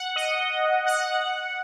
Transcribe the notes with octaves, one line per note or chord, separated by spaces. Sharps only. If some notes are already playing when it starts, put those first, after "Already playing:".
Already playing: F#5
D#5
F#5